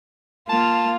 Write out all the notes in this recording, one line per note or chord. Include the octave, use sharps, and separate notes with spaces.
A#3 F4 F5 A5